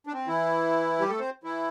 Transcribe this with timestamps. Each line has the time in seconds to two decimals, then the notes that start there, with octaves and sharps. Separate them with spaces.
0.07 D4
0.13 C4
0.28 E3 E4
1.00 G3 G4
1.10 A3 A4
1.20 C4 C5
1.44 E3 E4